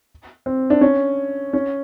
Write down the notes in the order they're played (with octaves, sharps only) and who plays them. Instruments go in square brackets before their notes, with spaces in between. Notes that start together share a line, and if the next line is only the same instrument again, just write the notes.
[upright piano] C4
D4
C#4
C#4